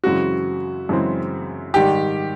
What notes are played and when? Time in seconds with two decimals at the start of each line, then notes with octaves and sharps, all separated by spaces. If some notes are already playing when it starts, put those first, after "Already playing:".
0.03 F#2 C#3 E3 G#3 C4 F#4
0.89 F#2 C#3 E3 G#3 C4
1.74 G#2 D#3 G3 G4